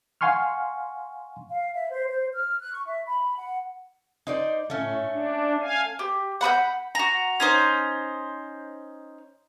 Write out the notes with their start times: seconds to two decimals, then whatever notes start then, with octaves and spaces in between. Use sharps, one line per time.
0.21 F5 F#5 G#5 C6 C#6 F6
1.50 F5
1.74 E5
1.90 C5
2.09 C5
2.34 F6
2.59 F#6
2.73 C#6
2.86 E5
3.07 B5
3.36 F#5
4.27 D#4 C5 D5
4.70 A2 A3 C#4
5.06 D4
5.62 F5 G#5
5.99 G4
6.41 F#5 B5 D#6 G6
6.95 F#4 A#5
7.40 C#4 D#4 C5